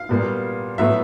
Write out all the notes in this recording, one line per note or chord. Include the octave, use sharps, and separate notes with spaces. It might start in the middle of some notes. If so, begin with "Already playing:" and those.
Already playing: F5
A#2 G3 B3
A2 F#3 B3 E5